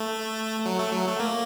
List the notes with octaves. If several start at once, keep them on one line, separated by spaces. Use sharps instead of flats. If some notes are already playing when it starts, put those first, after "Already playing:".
Already playing: A3
F#3
A3
F#3
A3
A#3